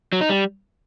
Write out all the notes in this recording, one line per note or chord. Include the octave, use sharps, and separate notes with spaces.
F#3
D#4
G3